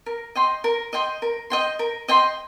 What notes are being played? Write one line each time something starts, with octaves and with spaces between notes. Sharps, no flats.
A#4
D#5 G5 C6
A#4
D#5 G5 C6
A#4
D#5 G5 C6
A#4
D#5 G5 C6